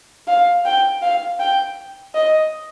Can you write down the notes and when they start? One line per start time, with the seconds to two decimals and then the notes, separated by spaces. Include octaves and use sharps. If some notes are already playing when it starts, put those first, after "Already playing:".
0.28 F5
0.65 G5
1.02 F5
1.39 G5
2.14 D#5